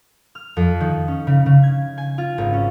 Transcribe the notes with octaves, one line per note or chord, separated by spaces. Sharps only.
F6
F2
D#3
C#4
C#3
C#3
G#6
G#5
F4
G#1
C#4